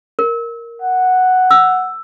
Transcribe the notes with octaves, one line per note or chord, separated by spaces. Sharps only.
A#4
F#5
E6